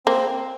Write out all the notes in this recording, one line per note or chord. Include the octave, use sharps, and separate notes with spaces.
A#3 C4